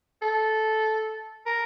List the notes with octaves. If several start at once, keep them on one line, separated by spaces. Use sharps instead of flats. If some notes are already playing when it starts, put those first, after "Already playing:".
A4
A#4